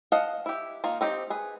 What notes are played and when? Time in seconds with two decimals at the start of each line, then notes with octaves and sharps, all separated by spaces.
0.12 D#5 F5 F#5 A5
0.46 E4 G4
0.84 D#3 A#3 F4
1.01 C4 D#4 G4
1.30 G#4 B4